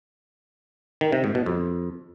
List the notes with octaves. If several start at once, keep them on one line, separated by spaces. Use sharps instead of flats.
D#3
C3
G#2
B2
F2